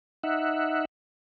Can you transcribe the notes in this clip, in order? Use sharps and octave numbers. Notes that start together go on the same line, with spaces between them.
D#4 E5 F#5